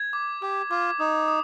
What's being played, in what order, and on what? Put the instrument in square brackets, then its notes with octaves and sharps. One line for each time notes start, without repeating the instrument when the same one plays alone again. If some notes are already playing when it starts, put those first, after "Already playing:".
Already playing: [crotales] G#6
D6
[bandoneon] G4 [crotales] D6
[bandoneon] F4 [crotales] D6
[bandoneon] D#4 [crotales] D#6
[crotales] D#6